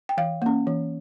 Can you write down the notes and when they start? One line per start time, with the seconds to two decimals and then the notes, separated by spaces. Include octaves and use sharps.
0.09 G5
0.17 E3 F5
0.42 A#3 C#4
0.67 E3